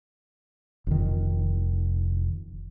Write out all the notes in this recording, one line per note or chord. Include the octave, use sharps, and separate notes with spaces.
F1 D#3